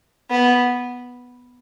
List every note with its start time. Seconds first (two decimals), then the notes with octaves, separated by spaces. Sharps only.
0.30 B3